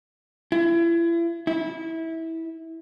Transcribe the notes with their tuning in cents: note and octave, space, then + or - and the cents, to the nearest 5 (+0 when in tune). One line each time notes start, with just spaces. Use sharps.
E4 +35
E4 -20